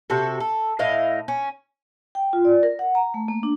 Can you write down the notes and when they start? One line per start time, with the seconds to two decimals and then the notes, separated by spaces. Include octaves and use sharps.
0.10 C3 F#4 A4
0.40 A4
0.79 A2 E4 D#5 F5
1.28 C#4
2.15 G5
2.33 F4
2.45 D5
2.63 A#4
2.79 F#5
2.95 A#5
3.14 A3
3.28 A#3
3.43 D4